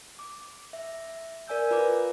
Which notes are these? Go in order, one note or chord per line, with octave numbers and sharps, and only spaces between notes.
D6
E5
A#4 D5 G#5 E6 G6
F4 B4 A#5 D6